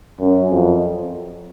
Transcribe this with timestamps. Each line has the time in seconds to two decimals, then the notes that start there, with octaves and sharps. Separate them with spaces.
0.20 F#2
0.51 F2